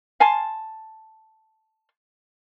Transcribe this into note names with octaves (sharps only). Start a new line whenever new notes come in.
F5 G#5 A5 C6